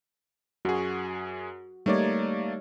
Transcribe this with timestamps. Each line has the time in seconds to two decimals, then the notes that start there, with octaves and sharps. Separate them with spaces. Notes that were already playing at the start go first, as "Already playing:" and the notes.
0.65 F#2 F#4 G#4
1.86 G3 A3 A#3 D#4 C#5 D5